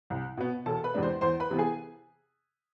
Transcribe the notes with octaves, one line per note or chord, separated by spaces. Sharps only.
C2
B2 B3
E1 A4 A5
B4 B5
E2 C3 G#3 D4
C5 C6
E2 C5 C6
B4 B5
C3 E3 B3
G#4 G#5